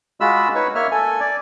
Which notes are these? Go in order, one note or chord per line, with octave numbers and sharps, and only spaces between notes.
G#3 F4 F#4 B5 E6
D#4 B4 C#5
A#3 C#5 E5 F6
A4 G#5
D5